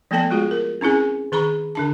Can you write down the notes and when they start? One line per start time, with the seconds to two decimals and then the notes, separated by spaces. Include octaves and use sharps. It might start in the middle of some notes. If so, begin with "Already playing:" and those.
0.11 F3 A3 B3 A4 G5 A5
0.31 G#3 F4 F#4 G#4
0.51 A#4
0.81 C4 C#4 E4 G#4 G#5
1.32 D#3 G#4 A#5 B5 C#6
1.75 D3 D4 A5